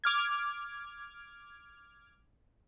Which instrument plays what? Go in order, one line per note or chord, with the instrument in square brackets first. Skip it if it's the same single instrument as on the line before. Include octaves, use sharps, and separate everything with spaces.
[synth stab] D6 F6 G#6